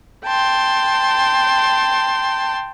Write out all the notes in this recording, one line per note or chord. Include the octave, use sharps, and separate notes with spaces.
G5 A5 C6